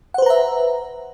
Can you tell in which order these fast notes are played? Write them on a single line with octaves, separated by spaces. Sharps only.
F#5 C5 B4 A#5 E5